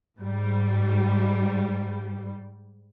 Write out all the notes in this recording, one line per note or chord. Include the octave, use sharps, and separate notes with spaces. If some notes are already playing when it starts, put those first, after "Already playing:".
G#2 G3